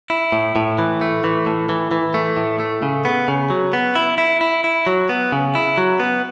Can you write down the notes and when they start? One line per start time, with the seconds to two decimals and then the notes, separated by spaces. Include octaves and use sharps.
0.10 E4
0.32 A2
0.56 A2
0.79 E3
1.01 A3
1.24 E3
1.46 A2
1.69 E3
1.91 E3
2.14 A3
2.37 A2
2.60 A3
2.82 C#3
3.05 B3
3.28 C#3
3.50 F#3
3.73 B3
3.96 E4
4.18 E4
4.41 E4
4.64 E4
4.86 F#3
5.09 B3
5.32 C#3
5.55 E4
5.78 F#3
6.00 B3